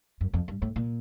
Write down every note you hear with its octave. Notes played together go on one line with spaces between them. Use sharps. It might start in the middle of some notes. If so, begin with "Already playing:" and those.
F#2
F2
G2
A2
A#2